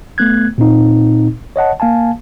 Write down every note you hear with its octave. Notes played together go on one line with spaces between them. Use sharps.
A3 B3 F#6 G#6
A#2 C4 D#4
C#5 D#5 F#5 A5
A#3 F5 G#5 A5